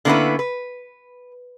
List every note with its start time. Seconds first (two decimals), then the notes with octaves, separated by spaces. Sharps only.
0.05 D3 A#3 B3 C#4 E4 B4
0.39 B4